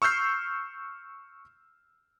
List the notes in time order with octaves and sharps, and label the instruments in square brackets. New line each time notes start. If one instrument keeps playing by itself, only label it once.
[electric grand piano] C#6 E6 F6 G6 C7